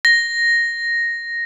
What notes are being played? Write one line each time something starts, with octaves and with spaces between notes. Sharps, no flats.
A#6